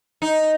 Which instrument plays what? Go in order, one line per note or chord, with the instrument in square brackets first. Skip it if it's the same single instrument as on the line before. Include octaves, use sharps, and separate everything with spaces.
[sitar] D#4